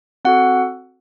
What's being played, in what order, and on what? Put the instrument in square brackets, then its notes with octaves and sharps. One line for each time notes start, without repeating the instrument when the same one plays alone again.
[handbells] C4 F#4 A4 F#5